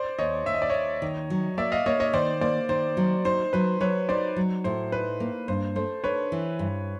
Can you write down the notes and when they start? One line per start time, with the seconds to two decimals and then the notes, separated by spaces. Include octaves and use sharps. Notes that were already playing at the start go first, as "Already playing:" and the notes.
Already playing: C5 D5
0.19 D#2 C#5 D#5
0.46 D#2 E5
0.54 D#5
0.62 D5
0.70 D#2 C#5 D#5
1.02 D#3
1.30 F#3
1.57 A#3 D5 E5
1.72 D#5 F5
1.86 A#3 C#5 D#5
2.00 C#5 D#5
2.13 D#3 C5 D5
2.41 A#3 C5 D5
2.69 D#3 C5
2.97 F#3
3.25 D#4 C5
3.53 F#3 B4
3.80 F#3 B4 C#5
4.09 D#4 C5 D5
4.36 F#3
4.64 A2 C5
4.92 D#4 B4
5.20 A#3
5.48 G2 C5
5.76 A3 C5
6.04 D4 B4 C#5
6.32 E3
6.59 G2